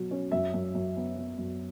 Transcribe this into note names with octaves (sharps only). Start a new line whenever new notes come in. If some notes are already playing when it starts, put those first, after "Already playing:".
Already playing: B2 F#3
C#4
F#2 E5
F#2
F#2
B3
B3
F#2